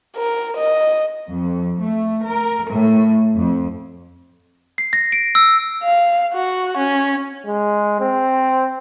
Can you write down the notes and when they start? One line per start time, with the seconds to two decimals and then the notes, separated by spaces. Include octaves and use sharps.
0.17 A#4
0.57 D#5
1.29 F2
1.81 A3
2.28 A#4
2.70 A2
3.35 F2
4.78 C7
4.93 A#6
5.12 D7
5.35 E6
5.83 F5
6.34 F#4
6.77 C#4
7.46 G#3
8.00 C4